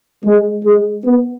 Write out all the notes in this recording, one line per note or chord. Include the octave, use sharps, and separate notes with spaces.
G#3
G#3
B3